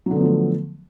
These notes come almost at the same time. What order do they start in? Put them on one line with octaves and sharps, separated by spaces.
F#3 D3 B3 F3 A3